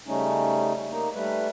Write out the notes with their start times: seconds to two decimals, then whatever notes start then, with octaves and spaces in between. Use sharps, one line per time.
0.07 C#3 G3 A3 C#4 D#4
0.90 A#3 D#4
1.15 G3 A3 B4